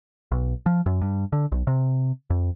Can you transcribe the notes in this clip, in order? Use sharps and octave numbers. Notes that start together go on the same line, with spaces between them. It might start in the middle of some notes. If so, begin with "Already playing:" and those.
B1
F3
F#2
G2
D3
B1
C3
F2